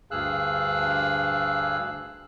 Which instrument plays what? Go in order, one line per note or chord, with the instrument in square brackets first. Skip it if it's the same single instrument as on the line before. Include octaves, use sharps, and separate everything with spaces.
[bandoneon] D2 G2 G#4 F5 E6 F#6